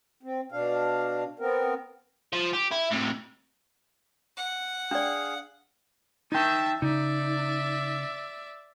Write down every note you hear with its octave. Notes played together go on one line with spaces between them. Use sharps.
C4
B2 D4 F5
B3 C4 A#4
F3
G4
E4
A2 C3
F#5
D4 G#4 D5 F5
D#4 E5 G5 A5
C#3 D#4 D5 E5